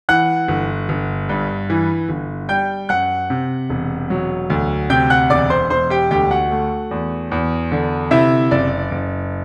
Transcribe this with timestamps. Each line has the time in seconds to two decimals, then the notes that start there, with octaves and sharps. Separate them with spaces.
0.09 E3 F#5 F#6
0.48 G1
0.89 G1
1.29 G2
1.70 E3
2.09 G1
2.49 G3 G5 G6
2.89 F#2 F#5 F#6
3.30 C3
3.70 E1
4.10 F#3
4.50 D2
4.90 C3 G5 G6
5.10 F#5 F#6
5.30 E1 D5 D6
5.50 C5 C6
5.70 E1 C5 C6
5.90 G4 G5
6.11 D2 G4 G5
6.30 F#4 F#5
6.51 A3
6.91 E2
7.31 E2
7.72 D3
8.11 C3 E4 E5
8.51 F#1 D5
8.91 F#1